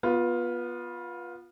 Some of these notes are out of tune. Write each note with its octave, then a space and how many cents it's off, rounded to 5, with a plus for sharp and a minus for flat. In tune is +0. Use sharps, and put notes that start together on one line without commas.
B3 -20 F4 +10